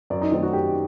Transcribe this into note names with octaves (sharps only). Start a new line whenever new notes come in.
F#2 D5
D#4
D#3 A3 C4 D#4
F#4
F#2 G4